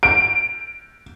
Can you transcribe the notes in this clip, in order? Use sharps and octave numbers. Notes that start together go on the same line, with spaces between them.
D7